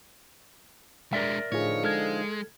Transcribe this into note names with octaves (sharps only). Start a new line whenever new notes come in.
G#3 D4 A#4 D5 E5
A2 D3 F3 D#4 F4 G#4 C#5
G#3 A4 F6 G#6